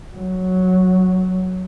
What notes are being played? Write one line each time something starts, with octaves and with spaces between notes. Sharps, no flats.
F#3